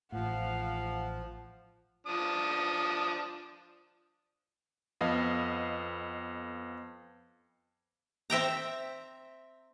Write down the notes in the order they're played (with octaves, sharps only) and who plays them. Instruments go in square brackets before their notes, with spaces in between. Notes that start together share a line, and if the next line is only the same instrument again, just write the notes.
[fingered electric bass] A1 A2 [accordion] F3 [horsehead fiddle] F5 F#5
[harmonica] F3 D4 D#6
[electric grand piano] F2 B3 D#5 F5
[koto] C4 E5 G5 A#5